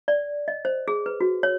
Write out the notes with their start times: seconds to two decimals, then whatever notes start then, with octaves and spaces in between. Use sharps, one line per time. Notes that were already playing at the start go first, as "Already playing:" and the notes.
0.08 D5
0.48 D#5
0.65 C5
0.88 G#4
1.06 B4
1.21 F#4
1.43 C#5